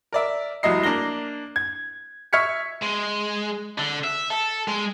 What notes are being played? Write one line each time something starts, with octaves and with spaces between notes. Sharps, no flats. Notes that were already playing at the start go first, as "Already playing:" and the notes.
A#4 D5 E5
F1 C2 F#3 E4 D#5 C7
A#3 D4 A#4 A#6 G7
G#6
E5 C#6 F6 G#6 B6 C#7
G#3
D3
E5
A4
G#3